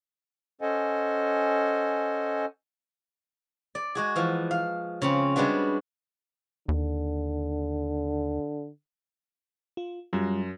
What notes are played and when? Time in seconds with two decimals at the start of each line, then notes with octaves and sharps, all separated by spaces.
0.61 C#4 A4 C5 D#5 F#5 G#5
3.75 D5
3.95 G#3 F#4 G#4
4.16 E3 F3 F5
4.51 F5
5.02 C#3 C4 C#4
5.36 G3 G#3 B3 D4 F#4
6.68 D#2 D3
9.77 F4
10.13 F#2 G3 F4